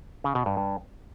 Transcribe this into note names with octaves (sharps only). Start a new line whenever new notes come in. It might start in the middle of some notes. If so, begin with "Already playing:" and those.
C#3
B2
G2
G2